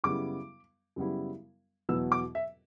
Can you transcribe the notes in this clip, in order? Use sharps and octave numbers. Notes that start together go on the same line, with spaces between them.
F#2 C#3 G3 B3 E4 D6
F#2 C#3 G3 B3 E4
E2 B2 F#3 B3 E4 E6
D6
E5